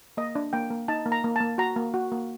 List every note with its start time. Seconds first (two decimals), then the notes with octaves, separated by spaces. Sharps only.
0.17 A#3 D#5
0.35 D4
0.53 A#3 G5
0.71 A#3
0.88 D#4 A5
1.06 A#3
1.12 A#5
1.24 A#3
1.36 A#3 A5
1.58 F#4 A#5
1.76 A#3
1.94 F#4
2.12 A#3